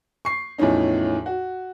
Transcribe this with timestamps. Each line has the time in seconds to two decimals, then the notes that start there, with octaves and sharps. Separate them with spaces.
0.25 C#6 C7
0.58 E2 A2 F3 C#4 D#4
1.26 F#4